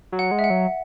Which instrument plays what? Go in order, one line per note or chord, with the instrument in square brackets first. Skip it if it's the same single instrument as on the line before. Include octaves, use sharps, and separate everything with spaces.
[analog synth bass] F#3
[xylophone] F#5
[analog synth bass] G#3
[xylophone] E5
F#5
[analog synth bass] F#3